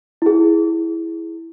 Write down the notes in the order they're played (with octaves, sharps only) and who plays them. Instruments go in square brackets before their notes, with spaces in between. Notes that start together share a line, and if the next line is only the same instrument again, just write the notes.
[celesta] E4 G#4